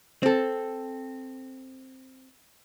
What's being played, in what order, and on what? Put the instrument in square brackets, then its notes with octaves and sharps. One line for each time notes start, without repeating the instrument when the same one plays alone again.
[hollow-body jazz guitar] C4 A4